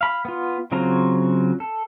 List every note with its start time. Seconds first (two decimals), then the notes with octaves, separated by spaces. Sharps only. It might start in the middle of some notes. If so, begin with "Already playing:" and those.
0.01 F5 B5
0.25 B3 F4
0.72 C#3 F#3 C4 F4 A#5
1.60 A4